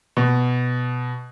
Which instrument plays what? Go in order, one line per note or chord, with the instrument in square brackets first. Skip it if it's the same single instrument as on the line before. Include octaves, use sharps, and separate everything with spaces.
[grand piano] B2